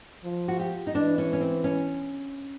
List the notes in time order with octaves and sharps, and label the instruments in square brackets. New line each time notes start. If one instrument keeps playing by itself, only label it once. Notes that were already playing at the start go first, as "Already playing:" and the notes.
[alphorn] F3
[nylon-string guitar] F#4
G4
D#4
[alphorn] E3 [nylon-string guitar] D4
[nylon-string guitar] C#4
C#4
C4
C#4